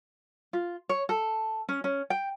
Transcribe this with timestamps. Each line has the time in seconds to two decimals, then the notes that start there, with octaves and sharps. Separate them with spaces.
0.53 F4
0.89 C#5
1.09 A4
1.69 C#4
1.84 C#4
2.10 G5